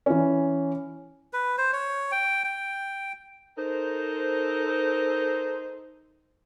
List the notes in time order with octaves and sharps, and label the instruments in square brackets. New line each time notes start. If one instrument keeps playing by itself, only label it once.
[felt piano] E3 C#4
[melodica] B4
C5
C#5
G5
G5
[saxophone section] D#4 A4 A#4 C5